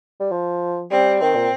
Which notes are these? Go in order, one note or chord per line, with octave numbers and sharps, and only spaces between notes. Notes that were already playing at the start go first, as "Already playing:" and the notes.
G3
F3
G3 C4
D#3 C4
A#2